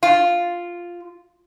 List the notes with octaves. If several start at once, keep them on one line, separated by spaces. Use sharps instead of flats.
F4